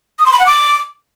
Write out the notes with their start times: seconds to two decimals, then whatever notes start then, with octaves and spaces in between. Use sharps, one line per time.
0.19 D#6
0.26 C6
0.33 B5
0.39 F#5
0.46 D6